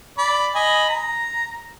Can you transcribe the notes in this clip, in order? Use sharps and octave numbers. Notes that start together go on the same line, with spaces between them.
D5 B5
D#5 G#5 B5
A#5